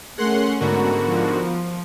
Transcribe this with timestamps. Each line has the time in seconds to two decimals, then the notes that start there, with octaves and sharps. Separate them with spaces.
0.18 A3 C#4 G#4 A#4 F#5 C6 F#6
0.60 G#2 D3 B3 F#4 A#4 A#5 B5
1.07 F3